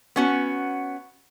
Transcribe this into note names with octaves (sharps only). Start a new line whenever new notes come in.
B3 C#4 F#4